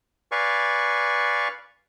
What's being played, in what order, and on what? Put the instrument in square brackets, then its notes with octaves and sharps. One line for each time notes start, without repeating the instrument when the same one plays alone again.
[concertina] B4 D5 F5 G#5 C#6